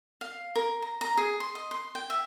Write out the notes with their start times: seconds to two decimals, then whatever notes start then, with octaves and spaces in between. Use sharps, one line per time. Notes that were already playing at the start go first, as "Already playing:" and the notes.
0.21 F5
0.56 A#4
0.82 A#5
1.01 A#5
1.17 G#4
1.40 C6
1.55 D#5
1.71 C6
1.95 G5
2.10 E5